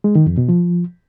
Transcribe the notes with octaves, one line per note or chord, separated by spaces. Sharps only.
G#3
D#3
F2
B2
F3